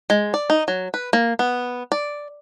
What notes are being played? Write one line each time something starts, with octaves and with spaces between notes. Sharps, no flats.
G#3
D5
D#4
F#3
B4
A#3
B3
D5